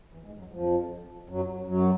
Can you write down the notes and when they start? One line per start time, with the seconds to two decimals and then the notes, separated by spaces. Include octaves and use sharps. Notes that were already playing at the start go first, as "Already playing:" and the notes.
0.13 E2 E3
0.26 G#2 G#3
0.39 F#2 F#3
0.52 F2 F3
1.29 F#2 F#3
1.67 F#2 F#3